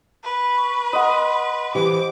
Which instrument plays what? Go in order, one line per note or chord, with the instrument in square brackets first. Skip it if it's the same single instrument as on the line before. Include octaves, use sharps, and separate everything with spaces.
[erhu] B4
[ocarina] C#6
[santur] D#5 F#5 [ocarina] C6
[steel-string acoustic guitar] E3 G4 [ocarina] C5 [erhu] D6